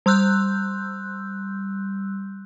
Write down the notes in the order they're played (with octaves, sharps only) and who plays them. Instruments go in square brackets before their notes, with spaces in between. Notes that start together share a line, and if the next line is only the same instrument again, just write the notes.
[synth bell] G3 C6 E6 F#6 G6